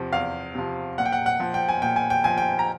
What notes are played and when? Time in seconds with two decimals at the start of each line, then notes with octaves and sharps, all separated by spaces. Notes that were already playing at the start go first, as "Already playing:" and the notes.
Already playing: E2 C3 F3
0.13 E2 F5
0.55 C3 F3
0.98 A#2 F#5
1.06 G5
1.12 F#5
1.26 F#5
1.40 F3
1.54 G5
1.69 G#5
1.82 A#2 G5
1.96 G#5
2.10 G5
2.24 F3 G#5
2.38 G5
2.59 A#5